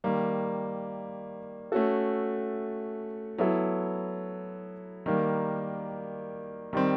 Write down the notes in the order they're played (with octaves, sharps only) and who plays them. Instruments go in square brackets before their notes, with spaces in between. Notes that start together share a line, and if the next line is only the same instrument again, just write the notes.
[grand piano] D#3 G3 A#3
A3 C#4 F#4 A4
F#3 B3 E4 A4
D#3 G3 A#3
D#3 G3 C4